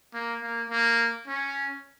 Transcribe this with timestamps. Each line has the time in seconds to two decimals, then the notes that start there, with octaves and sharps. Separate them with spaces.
0.14 A#3
0.42 A#3
0.70 A#3
1.27 C#4